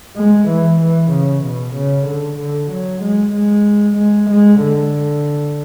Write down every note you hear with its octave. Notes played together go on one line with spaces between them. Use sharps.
G#3
E3
E3
C#3
B2
C#3
D3
D3
F#3
G#3
G#3
G#3
G#3
D3